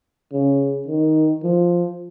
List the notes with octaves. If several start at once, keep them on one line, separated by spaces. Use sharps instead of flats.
C#3
D#3
F3